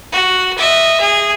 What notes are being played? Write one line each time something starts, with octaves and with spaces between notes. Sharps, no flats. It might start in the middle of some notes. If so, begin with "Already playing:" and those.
F#4
D#5 E5
G#4